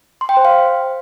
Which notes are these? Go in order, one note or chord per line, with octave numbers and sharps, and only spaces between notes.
C6
G5
C5
F5